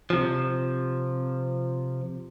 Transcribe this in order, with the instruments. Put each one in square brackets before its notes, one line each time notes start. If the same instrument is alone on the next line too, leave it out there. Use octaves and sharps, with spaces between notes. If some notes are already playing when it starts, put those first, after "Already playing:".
[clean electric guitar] C3 F3